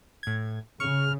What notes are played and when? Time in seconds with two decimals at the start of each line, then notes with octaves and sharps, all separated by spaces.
0.23 A2 G#6
0.80 C#3 C#6 F6